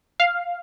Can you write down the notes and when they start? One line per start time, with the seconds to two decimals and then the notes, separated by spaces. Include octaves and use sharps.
0.20 F5